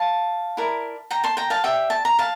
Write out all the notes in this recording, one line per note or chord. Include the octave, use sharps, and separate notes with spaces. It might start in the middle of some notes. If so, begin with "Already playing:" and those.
Already playing: F5 A5
E4 A#4 D5
G5 A#5
A5 C6
G5 A#5
F5 A5
G4 D5 E5 G5
A5
A#5
F5 A5